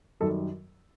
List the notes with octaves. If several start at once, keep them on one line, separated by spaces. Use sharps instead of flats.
F#2 D#3 G3 A4